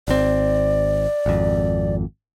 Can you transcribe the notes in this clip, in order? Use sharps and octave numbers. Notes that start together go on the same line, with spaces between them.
G#1 C4 D5
G#1 F2